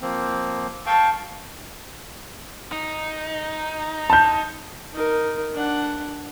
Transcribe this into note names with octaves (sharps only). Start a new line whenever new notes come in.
F3 A#3 C4
F5 G5 A5 C#6
D#4
A5 G6
D#4 A#4
D4 F#5